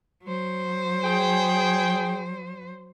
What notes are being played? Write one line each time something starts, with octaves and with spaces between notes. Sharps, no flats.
F#3 C5
G#4 G5